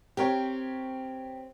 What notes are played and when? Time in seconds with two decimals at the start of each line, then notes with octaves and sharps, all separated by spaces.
0.17 C4 G4 A#4 C#5